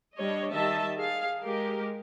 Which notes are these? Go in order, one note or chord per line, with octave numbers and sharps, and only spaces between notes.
G3 D4 C#5 D#5
D#3 G3 D#5 E5 A5
G#4 F5
G#3 G4 A#4